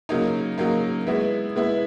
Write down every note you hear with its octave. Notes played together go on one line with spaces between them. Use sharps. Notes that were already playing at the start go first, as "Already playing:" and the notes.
C#3 F#3 A#3 D#4
C#3 F#3 A#3 D#4
G#3 B3 E4
G#3 B3 E4